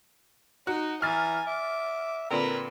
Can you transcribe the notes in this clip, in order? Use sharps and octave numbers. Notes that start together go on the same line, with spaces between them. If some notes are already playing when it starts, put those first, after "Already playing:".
D#4 F#4
E3 G#5 A#5 F6 A6
E5 D6
A#2 D3 C4 A#4 B4